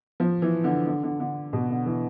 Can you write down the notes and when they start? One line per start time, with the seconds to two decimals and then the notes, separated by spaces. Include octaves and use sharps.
0.20 F3
0.42 E3
0.64 D3
0.87 D3
1.03 D3
1.20 D3
1.53 B2
1.70 D3
1.86 E3